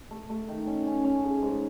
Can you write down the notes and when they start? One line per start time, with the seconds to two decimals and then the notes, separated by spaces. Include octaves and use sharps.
0.11 A3
0.30 A3
0.48 D#3
0.67 C#4
0.86 C#4
1.05 C#4
1.24 C#3
1.42 G#2